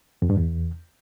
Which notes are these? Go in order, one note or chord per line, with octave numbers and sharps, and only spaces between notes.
F2
G2
E2